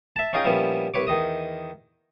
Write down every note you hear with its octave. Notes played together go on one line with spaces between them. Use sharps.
E5 A5
C#4 D#4 F4 G#4 D#5 G5
A#2 F3 G3 B3 C#4 E4
C2 B4 C#5 D6
E2 D#3 D#5 D#6